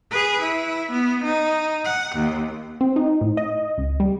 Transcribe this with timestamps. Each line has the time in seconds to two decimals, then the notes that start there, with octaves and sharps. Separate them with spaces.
0.11 G#4 B4
0.42 E4
0.92 B3
1.24 D#4
1.85 F#5
2.16 D#2
2.81 C4
2.96 D#4
3.21 A2
3.37 D#5
3.78 C#2
4.00 G3